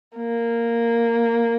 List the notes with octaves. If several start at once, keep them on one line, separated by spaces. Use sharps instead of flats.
A#3